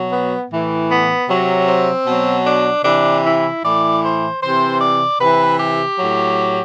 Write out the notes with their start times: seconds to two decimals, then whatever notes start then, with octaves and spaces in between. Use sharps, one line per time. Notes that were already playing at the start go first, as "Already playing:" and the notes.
Already playing: B2 F#3
0.10 B3
0.49 A2 E3
0.88 B3
1.28 C3 F#3
1.67 C4
2.06 B2 F#3
2.46 D4
2.84 C3 E3 D4
3.24 E4
3.63 A2 E3 D5
4.03 C5
4.41 C3 E3 C5
4.81 D5
5.20 C3 E3 B4
5.59 G4
5.99 A2 F#3